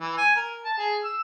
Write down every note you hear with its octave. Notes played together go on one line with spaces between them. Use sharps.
E3
G#5
A#4
A5
G#4
E6